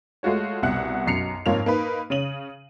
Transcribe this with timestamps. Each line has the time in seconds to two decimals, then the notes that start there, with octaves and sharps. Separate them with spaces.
0.23 G#3 A3 F4 F#4 C#5
0.62 C2 B2 E5 F#5 F#6
1.06 B1 F#2 C7 C#7 F7
1.46 F2 G#2 A#3 F4 C#5 F7
1.66 A#3 D#4 B4
2.10 C#3 C#4 D#7 F#7